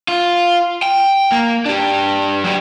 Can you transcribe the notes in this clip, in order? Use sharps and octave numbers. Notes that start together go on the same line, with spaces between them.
F4
G5
A#3
D4 G4
F#3 G4